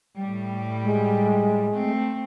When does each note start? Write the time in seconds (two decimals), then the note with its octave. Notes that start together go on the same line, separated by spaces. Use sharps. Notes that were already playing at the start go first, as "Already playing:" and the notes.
0.17 A2 G3
0.84 G#3
1.72 A3 C4